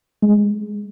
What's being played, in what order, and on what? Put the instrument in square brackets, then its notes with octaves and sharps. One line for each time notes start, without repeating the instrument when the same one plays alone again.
[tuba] G#3